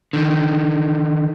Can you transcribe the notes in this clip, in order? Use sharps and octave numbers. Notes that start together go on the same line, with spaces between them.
D3 D#3